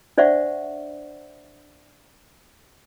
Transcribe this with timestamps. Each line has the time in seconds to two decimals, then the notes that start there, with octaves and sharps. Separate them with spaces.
0.18 D4 C5 D5 E5 F#5 C#6